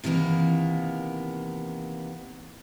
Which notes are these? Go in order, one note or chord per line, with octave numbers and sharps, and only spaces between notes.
C3 D#3 E3 A#3 B3